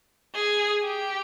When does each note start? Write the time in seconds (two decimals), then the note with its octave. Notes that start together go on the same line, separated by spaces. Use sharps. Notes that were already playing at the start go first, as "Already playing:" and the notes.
0.35 G#4
0.83 G4